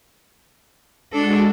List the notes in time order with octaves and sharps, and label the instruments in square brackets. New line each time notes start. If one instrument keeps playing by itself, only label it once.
[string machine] G#3 F#4 [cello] D4 A4